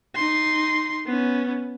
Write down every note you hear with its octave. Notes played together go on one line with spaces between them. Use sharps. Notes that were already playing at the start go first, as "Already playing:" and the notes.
D#4 C6
B3 C#4